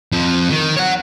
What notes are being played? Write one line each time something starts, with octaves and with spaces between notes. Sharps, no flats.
F2 F3
D#3
C#5 F#5